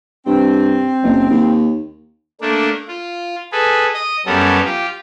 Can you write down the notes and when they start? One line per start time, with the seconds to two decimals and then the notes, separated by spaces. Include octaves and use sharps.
0.26 G2 C4
1.03 F#1
1.30 D#2
2.41 A3 A#3 D4
2.88 F4
3.52 G#4 A4 B4
3.94 D#5 D#6
4.26 F#2 G3 B3 C#4 A4 A#4
4.65 F4 G4